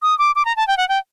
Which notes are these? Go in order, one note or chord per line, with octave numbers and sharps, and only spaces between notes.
D#6
D6
D6
A#5
A5
G5
F#5
G5